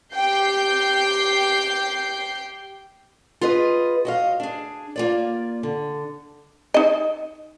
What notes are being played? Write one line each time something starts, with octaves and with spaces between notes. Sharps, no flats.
G4 G5 G6 C7
F4 G#4 B4 D#5
F#4 D#5 F5
D4 G#4
A#3 F4 D5
D3
D#4 D#5